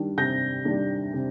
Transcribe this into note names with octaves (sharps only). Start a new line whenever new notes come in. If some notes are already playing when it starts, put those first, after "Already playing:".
Already playing: D#3 G3 D4
C3 G6 A#6
D#3 G3 D4
C3